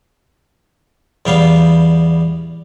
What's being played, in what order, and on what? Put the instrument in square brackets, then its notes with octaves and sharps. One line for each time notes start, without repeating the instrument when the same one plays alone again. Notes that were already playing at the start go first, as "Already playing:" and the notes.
[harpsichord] E2 G3 B3 F5